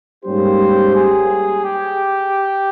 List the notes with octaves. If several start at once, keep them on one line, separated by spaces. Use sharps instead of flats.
G#2 G3 A#3 C#4 G4 C5
G#4
G4